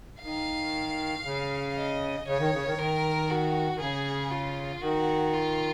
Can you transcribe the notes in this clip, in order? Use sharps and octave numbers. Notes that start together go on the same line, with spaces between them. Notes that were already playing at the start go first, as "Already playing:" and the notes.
D#3 F5
C#3
D#5
C#3 C#5
D#3
C#3
D#3
D#3 A#4
F#4
D#3
C#3 G#4
F4
D#3 F#4
F4